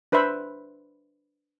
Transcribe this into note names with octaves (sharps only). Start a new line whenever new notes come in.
D4 B4 C5 E5 B5